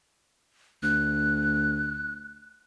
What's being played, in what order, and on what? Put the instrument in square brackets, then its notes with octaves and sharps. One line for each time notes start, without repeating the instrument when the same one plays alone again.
[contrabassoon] D2 [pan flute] F#6